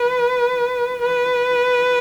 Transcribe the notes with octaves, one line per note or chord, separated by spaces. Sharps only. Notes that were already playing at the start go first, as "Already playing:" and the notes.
Already playing: B4
B4